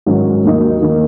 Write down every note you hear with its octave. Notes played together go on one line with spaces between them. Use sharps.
G#2 D#3 F#3 C#4
D#2 D#3 F#3 A#3 D#4
D#3 A#3